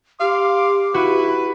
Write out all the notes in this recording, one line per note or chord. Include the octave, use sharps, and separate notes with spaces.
G4 F5 C6 D6
E4 F#4 B4